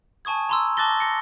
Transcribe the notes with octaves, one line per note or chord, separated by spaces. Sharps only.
G#5 A5 C#6 D#6 G#6
A#5 C6 E6
A5 D6 F#6 A6 A#6 G7
A#6 C#7